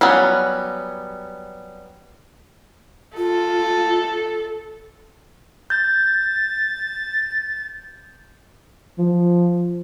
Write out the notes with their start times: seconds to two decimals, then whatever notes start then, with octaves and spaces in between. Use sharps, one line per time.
0.01 F#3 G3 B3 C#4
3.17 F4 A4
5.70 G6 A6
8.98 F3